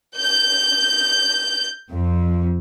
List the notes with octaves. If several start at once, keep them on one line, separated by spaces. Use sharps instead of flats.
G6
F2